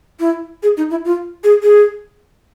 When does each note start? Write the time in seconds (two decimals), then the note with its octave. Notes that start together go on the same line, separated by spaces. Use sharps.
0.20 E4
0.63 G#4
0.77 D#4
0.91 E4
1.05 F4
1.44 G#4
1.63 G#4